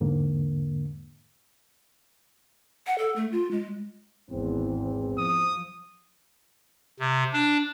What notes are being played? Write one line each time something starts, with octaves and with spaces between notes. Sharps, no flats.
E2 G#2 D3 A#3
F#5
A4
A3
F4
G#3
G#1 E2 C4
F3 D#6
C3
D4